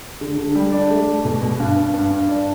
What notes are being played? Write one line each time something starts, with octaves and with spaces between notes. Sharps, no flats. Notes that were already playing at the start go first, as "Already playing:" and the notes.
D3
D3
G3
D4
A3
A3
B2
B2
G2
G2
G2
G2
D4